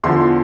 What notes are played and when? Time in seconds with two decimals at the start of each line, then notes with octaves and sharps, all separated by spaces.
0.03 E2 D3 F3 C6